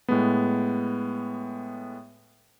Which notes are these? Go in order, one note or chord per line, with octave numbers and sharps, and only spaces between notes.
A2 G#3 B3